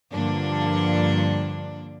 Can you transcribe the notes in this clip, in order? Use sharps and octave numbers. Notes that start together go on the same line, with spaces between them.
G2 D3 F3 A#3 D4